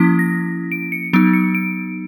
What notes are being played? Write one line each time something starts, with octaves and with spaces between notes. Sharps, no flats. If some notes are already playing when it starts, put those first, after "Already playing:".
Already playing: F3 A#3 C#4 E4 B6
A#6
D7
C#7
F#3 B3 D#4 D7
C#7
D7